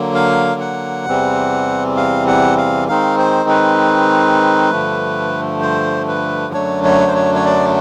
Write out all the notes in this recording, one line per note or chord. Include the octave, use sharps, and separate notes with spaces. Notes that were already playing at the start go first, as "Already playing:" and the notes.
Already playing: D3 F#3 A#3
F5
F#5
E2 C3 E3 G3 C4
F5
F#5
F5
D#3 G#3 C4 D#4 F5
C5
B4
G2 D3 F3 A3
C5
B4
F#2 D3 F#3 A3 D4 C#5
C#5
C5
C#5
C#5
D5